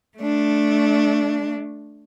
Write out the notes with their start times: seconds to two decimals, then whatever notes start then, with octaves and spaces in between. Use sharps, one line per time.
0.17 A3 D4